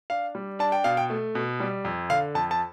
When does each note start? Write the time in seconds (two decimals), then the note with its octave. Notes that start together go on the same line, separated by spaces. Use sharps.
0.10 D4 F5
0.35 G3
0.59 D4 A5
0.72 G5
0.84 B2 F5
0.97 G5
1.10 A3
1.35 B2
1.60 G3
1.85 F2
2.10 D3 F5
2.35 F2 A5
2.51 A5